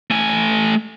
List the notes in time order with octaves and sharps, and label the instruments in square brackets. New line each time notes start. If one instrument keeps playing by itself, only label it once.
[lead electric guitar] A3 G#5